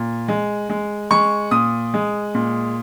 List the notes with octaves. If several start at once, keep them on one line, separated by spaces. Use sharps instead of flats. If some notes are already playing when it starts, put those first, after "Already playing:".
Already playing: A#2
G#3
G#3
G#3 C#6
A#2 D#6
G#3
A#2